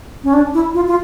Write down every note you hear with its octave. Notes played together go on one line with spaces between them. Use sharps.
C#4
D4
E4
F4
F4